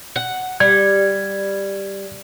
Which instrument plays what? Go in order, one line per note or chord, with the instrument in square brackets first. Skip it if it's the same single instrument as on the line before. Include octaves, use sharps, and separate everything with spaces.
[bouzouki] F#5
[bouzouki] G3 [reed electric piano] G#6